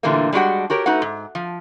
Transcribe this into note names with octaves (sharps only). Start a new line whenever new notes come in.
A#2 D3 E3 G3 A3 A#3
G3 G#3 D4 F#4 G4 F#5
F#4 G4 A#4 C#5
A3 D#4 F#4 B4 F#5
G#2
F3